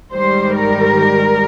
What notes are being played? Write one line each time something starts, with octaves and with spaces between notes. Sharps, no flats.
G#2 D#3 G3 C5
A#4